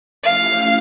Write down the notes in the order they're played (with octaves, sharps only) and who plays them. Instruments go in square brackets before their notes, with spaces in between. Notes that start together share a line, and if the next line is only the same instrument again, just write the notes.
[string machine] F3 A3 C#4 E4 G4 [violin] F5